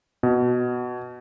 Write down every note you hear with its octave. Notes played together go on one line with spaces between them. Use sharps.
B2